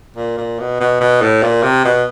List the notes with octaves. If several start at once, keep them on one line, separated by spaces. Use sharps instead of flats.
A#2
A#2
B2
B2
B2
A2
A#2
C3
B2